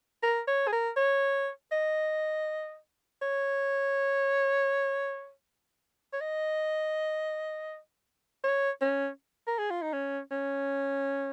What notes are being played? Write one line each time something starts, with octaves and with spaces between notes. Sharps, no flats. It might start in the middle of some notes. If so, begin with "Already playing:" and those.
A#4
C#5
G#4
A#4
C#5
D#5
C#5
C#5
D#5
C#5
C#4
A#4
G#4
F4
D#4
C#4
C#4